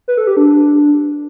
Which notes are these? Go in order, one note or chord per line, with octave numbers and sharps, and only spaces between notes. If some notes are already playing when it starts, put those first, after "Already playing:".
B4
A4
G4
D4